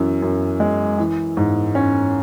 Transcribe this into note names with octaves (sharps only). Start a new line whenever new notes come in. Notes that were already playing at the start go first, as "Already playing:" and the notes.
Already playing: F#2 E3
F#2
G#3
E3
G#2
C#4